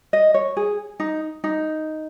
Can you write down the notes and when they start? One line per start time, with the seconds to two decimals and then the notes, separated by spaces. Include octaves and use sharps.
0.13 D#5
0.34 C#5
0.57 G#4
1.00 D#4
1.44 D#4